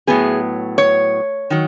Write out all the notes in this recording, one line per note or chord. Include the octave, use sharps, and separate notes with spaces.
A2 F#3 B3 G#4
C#5
D#3 F#3